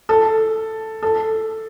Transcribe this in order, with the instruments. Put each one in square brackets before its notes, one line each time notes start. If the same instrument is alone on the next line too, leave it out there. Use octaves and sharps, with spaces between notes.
[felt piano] A4
A4